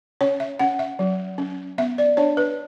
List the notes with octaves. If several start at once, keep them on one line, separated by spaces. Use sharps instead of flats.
C#4 C#5
E5
C#4 F#5
E5
F#3
C#4
B3 E5
D5
D4 C#5
B4